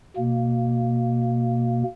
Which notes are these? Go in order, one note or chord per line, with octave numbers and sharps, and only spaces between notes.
B2 A#3